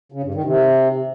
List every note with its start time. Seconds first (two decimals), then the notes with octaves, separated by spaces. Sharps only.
0.12 C#3
0.23 G2
0.34 D#3
0.45 C3